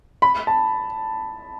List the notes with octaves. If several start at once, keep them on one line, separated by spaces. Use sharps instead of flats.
B5
A5